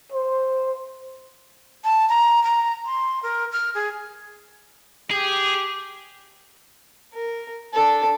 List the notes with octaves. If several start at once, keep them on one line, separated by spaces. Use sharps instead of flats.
C5
A5
A#5
A#5
C6
A#4
F6
G#4
G4 G#4
A#4
D4 A4